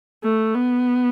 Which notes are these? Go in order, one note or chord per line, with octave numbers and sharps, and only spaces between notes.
A3
B3